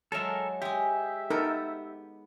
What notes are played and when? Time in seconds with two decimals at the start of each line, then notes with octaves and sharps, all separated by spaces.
0.12 F#3 G#3 A4 A#4 E5
0.62 G#3 G4 G#4 E5
1.30 B3 D#4 A4 A#4